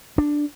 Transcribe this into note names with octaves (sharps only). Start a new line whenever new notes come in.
D4